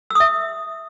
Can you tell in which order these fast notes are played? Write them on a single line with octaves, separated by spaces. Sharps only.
E6 D#6 E5